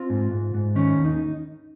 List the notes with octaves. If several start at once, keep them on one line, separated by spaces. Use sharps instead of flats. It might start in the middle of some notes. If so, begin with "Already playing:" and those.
Already playing: C4 F4
G#2
G#2
G#2
D#3 C#4
D#2
D#4